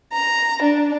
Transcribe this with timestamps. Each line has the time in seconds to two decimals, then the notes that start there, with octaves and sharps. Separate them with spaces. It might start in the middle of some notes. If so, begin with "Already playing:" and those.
0.12 A#5
0.61 D4